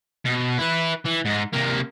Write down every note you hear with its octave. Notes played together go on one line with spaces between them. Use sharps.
B2
E4 B4
E3
G#2 D#4
C3 A#3